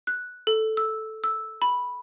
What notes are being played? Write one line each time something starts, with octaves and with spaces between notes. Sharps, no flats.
F#6
A4
E6
E6
B5